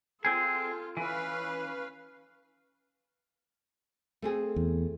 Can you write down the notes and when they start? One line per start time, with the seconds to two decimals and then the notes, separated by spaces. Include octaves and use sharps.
0.25 C4 F4 G#4 A4
0.97 E3 C#4 B4 F5
4.22 A3 C4 G#4
4.56 E2